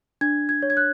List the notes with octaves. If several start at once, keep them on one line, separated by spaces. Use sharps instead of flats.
D4 G#6
G#6
C#5
G#6
F#6